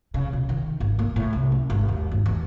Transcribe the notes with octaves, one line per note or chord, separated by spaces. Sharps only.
C#3
B2
D#3
G#1
A#3
A2
C2
C#4
G#1
D#2
G#1
E2